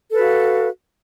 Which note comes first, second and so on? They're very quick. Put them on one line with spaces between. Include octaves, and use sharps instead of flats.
A4 B4 F#4 F5